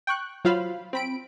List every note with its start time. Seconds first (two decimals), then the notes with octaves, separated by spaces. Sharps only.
0.07 G5 C#6 F#6
0.45 F#3 F4 C5 F5 B5
0.93 C4 B5 D7